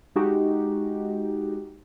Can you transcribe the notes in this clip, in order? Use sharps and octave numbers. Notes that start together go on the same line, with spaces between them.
G#3 D#4 F#4 G4